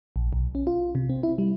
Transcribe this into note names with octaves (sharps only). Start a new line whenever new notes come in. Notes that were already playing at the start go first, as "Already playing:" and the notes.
A#1
B1
C#4
F4
C3
C4
E4
G3